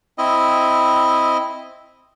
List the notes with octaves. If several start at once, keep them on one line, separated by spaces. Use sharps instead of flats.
C4 E4 D#5